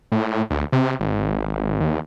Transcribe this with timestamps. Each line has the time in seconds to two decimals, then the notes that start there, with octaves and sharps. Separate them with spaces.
0.12 A2
0.50 D2
0.72 C3
1.00 G#1
1.80 D#2